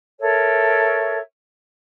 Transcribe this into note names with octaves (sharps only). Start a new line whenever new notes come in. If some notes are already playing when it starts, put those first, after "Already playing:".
A4 A#4 C#5 E5